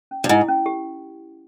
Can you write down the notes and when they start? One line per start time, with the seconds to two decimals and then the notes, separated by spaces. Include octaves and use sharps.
0.11 C#4
0.24 G2
0.29 G#2 E4
0.48 C#4
0.66 G4